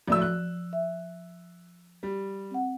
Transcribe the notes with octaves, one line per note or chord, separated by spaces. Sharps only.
D1 F3 A3 D5 E6
F#6
E5
G3
C4 F#5